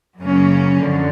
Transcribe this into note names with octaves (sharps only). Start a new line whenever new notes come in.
F#2 C#3 F#3 A#3 C#4
F#2 D3 F3